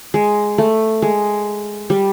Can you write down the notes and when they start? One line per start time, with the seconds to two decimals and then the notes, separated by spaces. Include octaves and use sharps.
0.14 G#3
0.58 A3
1.02 G#3
1.90 G3